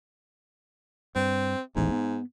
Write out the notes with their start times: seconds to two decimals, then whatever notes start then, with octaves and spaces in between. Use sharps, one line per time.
1.16 G2 C4
1.76 D#1 A1 E2 G#2
1.91 B3